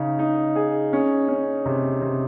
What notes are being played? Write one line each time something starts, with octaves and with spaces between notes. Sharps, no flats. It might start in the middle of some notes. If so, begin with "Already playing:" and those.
Already playing: C#3 D#4
D#4
G#4
C#4
C#4
C3
C3